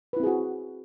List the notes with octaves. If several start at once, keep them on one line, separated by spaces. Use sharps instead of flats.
C4 E4 F#4 G#4 B4